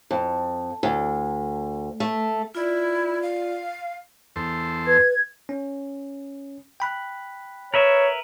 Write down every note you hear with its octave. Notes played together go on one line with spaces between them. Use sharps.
F2
D2
A3
E4 F4 D5
F5
E2 A4 C5
B4 G#6
C#4
G5 B5 F#6
A#4 B4 C#5 E5